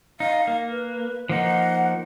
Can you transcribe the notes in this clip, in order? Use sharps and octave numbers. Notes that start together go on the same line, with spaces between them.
D#4 F5
A#3
B4
F3 A#3 D#4 F#5